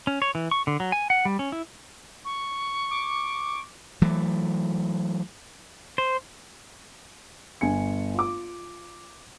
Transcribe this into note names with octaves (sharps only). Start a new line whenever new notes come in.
C#4
C#5
E3
C#6
D3
F#3
G#5
F#5
G3
C#4
E4
C#6
D6
E3 F#3 A3
C5
G1 G#5 C#7
F4 D6